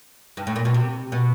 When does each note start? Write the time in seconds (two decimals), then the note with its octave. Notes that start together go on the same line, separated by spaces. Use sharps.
0.37 G2
0.47 A2
0.56 A#2
0.65 B2
0.74 C3
1.12 B2